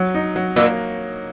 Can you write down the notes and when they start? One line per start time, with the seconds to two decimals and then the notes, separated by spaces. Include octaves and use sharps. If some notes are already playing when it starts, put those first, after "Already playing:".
Already playing: F#3
0.14 D#4
0.36 F#3
0.56 A#2 A#3